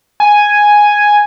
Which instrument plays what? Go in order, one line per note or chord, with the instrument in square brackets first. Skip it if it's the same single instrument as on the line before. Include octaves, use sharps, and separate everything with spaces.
[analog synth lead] G#5